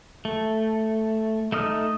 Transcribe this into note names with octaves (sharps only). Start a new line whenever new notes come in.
A3
A3 D#4 D#6 F6